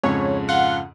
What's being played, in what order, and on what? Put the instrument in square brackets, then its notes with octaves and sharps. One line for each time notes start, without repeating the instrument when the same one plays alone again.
[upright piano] F2 G#2 C#3 [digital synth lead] C#5
[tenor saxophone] F4 [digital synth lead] F#5